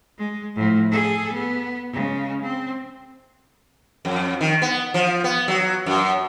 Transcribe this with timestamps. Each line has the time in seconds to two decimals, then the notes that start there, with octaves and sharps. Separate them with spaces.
0.18 G#3
0.56 A2 F3
0.91 G#4 A4
1.33 B3
1.93 C#3 G#3
2.42 C4
4.05 F2
4.41 D#3
4.62 B3
4.94 F3
5.24 B3
5.48 F#3
5.86 F#2